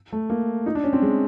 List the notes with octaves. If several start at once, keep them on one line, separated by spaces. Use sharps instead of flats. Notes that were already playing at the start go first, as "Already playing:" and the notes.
A3
A#3
D#4
D4
C#4
C4
G#3